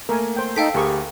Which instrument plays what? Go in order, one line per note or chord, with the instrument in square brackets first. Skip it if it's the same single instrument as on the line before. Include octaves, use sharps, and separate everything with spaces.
[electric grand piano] A3 A#3 [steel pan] A#4 G#5
[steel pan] C5 G5
[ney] D#4 [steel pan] A4 [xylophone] F5 G5 B6
[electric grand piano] D2 [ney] G4 [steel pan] G#4 A#4 C#6